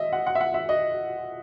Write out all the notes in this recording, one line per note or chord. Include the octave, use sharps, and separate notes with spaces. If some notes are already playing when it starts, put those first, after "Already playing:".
Already playing: D#5 E5
F#5
F#5
E5
F#5
E5
D#5